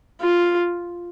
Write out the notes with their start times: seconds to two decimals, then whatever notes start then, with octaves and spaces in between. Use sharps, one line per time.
0.22 F4